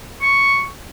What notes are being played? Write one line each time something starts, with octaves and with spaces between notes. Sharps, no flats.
C#6